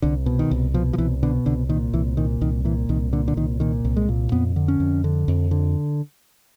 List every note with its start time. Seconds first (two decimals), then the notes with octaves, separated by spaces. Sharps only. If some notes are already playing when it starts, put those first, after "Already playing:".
0.02 C2 D3
0.26 B2
0.39 D#3
0.51 C2
0.74 B2 F3
0.93 F3
0.98 C2 E3
1.23 B2 D3
1.46 C2 D3
1.69 A#2 D#3
1.93 C2 E3
2.17 A#2 D#3
2.41 C2 D#3
2.65 A#2 E3
2.89 C2 D#3
3.13 A#2 D3
3.28 D3
3.37 C2 D#3
3.60 A#2 D#3
3.84 C2
3.97 G#3
4.09 A#2
4.32 F2 B3
4.56 D3
4.68 C#4
4.80 F2
5.04 D3
5.28 F2
5.51 D3